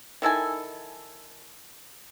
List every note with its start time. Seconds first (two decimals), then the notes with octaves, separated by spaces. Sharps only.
0.22 D#3 E4 A4 G#5